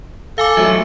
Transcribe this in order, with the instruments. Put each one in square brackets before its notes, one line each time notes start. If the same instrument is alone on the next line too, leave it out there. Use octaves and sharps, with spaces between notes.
[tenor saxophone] A4 [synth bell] F5 G#5 D6
[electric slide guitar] F3 F#3 A3 [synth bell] E5